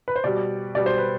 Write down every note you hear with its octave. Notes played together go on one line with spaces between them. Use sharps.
B4
C5
B2 G3 D5
B2 G3 D5
C5
B4